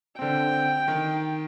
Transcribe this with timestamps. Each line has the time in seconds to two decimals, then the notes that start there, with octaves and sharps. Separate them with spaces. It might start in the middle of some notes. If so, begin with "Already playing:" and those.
0.19 D3 C4 G5
0.88 D#3